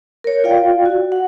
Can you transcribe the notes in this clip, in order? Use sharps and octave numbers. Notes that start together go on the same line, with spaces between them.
A#4 C#5
F4 D5 F5 G5
F#4
F#5